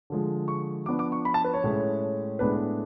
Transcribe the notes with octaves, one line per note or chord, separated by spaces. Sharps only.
D3 F3 G#3
C#6
F3 B3 D4 D6
D6
C#6
B5
A5
B4
C#5
A2 G#3 C#4
A2 G#3 B3 D4 B4